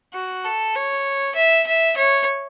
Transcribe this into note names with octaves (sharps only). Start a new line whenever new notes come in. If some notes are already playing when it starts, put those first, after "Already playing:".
F#4
A4
C#5
E5
E5
C#5